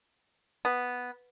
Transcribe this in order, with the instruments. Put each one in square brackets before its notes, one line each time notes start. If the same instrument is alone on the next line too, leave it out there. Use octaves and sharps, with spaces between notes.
[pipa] B3